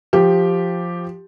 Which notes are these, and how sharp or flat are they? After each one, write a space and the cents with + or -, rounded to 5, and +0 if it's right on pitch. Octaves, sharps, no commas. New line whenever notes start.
F3 +0 G4 +0